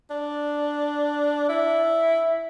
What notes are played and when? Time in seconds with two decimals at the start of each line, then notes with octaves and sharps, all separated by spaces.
0.11 D4
1.49 E4